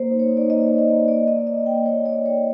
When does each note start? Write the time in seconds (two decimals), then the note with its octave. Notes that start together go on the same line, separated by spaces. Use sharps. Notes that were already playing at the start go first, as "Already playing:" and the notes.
Already playing: A#3 C5
0.10 D#4
0.19 C#5
0.30 D#4
0.37 D5
0.49 A#3 D#5
0.69 A#3
0.78 D5
0.88 A#3
1.08 A#3 D5
1.28 A#3 D#5
1.47 A#3 D#5
1.66 A#3 G5
1.86 A#3 C#5
2.05 A#3 D5
2.25 D#4 C#5